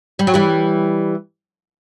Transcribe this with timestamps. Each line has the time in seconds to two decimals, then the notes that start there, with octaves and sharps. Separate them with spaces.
0.19 G3
0.27 F#3
0.34 E3 G3